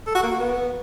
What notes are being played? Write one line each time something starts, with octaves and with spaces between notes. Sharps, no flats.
A4
F#4
A#3
F#4
B3